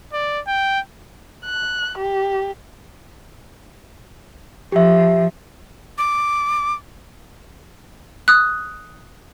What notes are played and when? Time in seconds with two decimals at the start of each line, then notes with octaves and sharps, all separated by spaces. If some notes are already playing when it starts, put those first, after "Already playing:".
0.13 D5
0.47 G5
1.45 F#6
1.98 G4
4.72 F3 G4 E5
5.98 D6
8.28 D#6 F#6